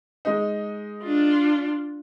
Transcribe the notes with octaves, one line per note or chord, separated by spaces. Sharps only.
G#3 D#4
D4 F4